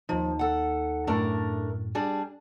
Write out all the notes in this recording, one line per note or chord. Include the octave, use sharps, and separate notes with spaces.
D#2 F3 D#4
A4 F#5
F#2 A2 A3 D4 A#4
G3 D4 G#4